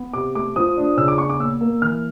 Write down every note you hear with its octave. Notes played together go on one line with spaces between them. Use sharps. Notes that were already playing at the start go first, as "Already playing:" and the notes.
Already playing: B3
C3 D6
A3 D6
F3 D#6
D4
C#3 E6
D6
B3 C#6
D6
A#2 E6
A#3
E3 F6